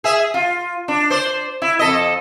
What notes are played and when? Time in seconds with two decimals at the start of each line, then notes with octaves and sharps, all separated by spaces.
0.04 G#4 E5
0.34 F4
0.88 D4
1.10 C5 D5
1.62 E4
1.79 F2 A4 D#5